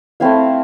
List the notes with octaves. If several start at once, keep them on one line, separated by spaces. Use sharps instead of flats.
A3 C4 E4 F5